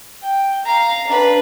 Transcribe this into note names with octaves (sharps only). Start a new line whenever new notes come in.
G5
F5 A#5
D4 B4